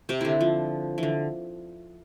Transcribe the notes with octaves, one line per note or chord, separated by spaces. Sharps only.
C3 C4
D3 D4 E4
F3
D3 E3